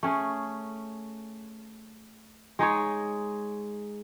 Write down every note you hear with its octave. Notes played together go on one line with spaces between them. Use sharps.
A3 C#4 G#4
G#3 D#4 G#4 C#5